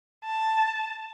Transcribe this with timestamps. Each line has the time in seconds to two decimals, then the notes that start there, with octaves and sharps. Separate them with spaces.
0.25 A5